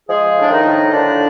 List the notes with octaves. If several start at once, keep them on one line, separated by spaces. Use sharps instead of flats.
F3 G#3 G#4
A2 D4
D#3 D#4
A2
D3 F3 D4